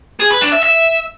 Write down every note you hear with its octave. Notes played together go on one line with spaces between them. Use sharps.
G#4
B4
D4
E5
E5